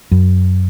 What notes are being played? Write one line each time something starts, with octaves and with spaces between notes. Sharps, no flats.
F#2